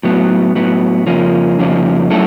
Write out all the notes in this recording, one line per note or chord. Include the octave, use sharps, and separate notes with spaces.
A2 F#3 B3
A2 F#3 B3
F2 C#3 F3 A#3 C#4
F2 C#3 F3 A#3 C#4
F#3 A3 C#4 E4 A4